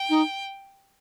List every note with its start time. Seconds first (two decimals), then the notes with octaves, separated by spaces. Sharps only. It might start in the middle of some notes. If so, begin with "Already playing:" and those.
Already playing: G5
0.09 D#4